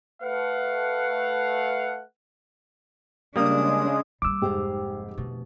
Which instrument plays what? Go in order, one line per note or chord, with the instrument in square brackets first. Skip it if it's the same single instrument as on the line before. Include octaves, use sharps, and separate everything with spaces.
[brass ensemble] A3 B4 F5 F#5
[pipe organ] C#3 G#3 [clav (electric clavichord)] G3 A#3 [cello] D4 [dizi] D#6
[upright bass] G3 A#3 [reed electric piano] D6 E6
[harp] F1 C5 F5 [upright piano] G#2 G4
[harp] B2 [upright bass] D3 A3